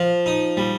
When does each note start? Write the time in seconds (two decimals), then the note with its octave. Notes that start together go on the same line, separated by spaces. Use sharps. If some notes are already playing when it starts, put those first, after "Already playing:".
Already playing: F3
0.26 D#4
0.57 G3